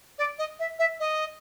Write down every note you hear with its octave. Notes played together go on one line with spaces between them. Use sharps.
D5
D#5
E5
E5
D#5